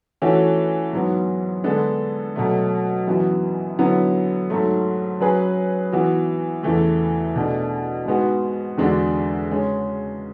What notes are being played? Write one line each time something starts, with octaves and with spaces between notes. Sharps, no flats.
E3 A3 C#4 F#4
G#2 F#3 B3
D3 G#3 B3 D4 A4
B2 F#3 A3
F#2 E3 B3 F#4
D3 F#3 B3 E4
G#2 F#3 A3
F#3 C#4 G#4 B4
E3 B3 F#4
E2 C#3 E3 A3
B2 A3 D4
G#2 G#3 B3 F#4
E2 D3 G#3 D4 F#4
C#3 G#3 C#4